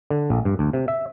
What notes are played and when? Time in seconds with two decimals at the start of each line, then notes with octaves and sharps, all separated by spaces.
0.10 D3
0.30 A#1
0.45 G2
0.59 D2
0.73 C3
0.88 E5